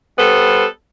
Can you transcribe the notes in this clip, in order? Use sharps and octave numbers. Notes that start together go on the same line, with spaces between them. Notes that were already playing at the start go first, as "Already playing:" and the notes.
G3 B3 A4 C5